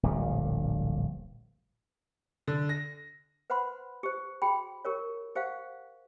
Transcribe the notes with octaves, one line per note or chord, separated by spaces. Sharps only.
D1 A#1 G2 G3
D3
A#6
B4 C5 F#5 B5 C6
G4 C5
F#4 G#4 G5 B5
G4 A#4 C#5
G4 C5 F5 F#5